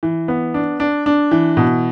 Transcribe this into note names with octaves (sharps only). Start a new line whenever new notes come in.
E3
B3
D4
D4
D4
E3
B2